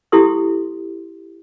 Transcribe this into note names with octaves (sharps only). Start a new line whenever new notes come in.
E4 G4 A4 C6 D#6